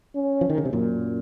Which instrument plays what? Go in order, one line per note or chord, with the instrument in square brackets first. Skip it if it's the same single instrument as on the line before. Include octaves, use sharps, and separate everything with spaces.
[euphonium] C#4
[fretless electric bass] F3
D#3
C#3
C3
F#2 A#2